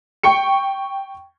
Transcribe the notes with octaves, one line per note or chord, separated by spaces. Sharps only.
G5 C#6 C#7